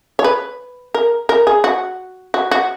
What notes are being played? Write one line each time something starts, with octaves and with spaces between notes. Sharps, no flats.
C#5
B4
A#4
A#4
G#4
F#4
F#4
F#4